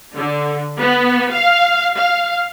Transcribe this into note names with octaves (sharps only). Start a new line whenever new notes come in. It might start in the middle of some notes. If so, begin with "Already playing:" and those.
D3
B3
F5
F5